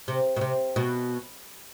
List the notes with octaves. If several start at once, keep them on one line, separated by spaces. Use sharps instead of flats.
C3
B2
C3
B2